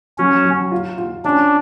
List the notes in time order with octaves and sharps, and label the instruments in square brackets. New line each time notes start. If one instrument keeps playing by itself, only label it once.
[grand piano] F#3 [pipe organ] C#4
[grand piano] F#3
F4
F4
[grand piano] C#4 [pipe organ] D4